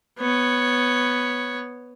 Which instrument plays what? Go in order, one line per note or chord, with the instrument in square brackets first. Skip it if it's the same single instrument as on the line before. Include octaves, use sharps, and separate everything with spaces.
[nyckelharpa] B3 C#5